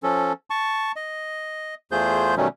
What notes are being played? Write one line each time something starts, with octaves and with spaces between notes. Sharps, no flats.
F3 C#4 A4
A5 C#6
D#5
E2 A3 F4 G#4 C5 G6
B2 D#3 F#3 G3 A3 C#4